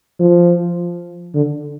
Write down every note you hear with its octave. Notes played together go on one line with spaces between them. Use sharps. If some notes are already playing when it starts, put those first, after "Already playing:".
F3
D3